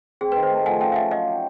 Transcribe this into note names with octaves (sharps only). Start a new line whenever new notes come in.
C4 G#4
B4
D#3
C5
A3
F3 F#5 G#5
C#4 F5 G5
F5
F3 E5 F#5
F#3 D#5 F5
G4